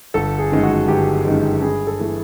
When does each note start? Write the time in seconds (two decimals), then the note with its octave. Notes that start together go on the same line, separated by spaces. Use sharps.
0.14 G1 A4
0.38 G#4
0.52 F#2 D#3 G#3
0.63 F#4
0.88 G1 G4
1.25 F#2 D#3 G#3
1.62 G2 G#4
1.87 A4
1.99 E3 A3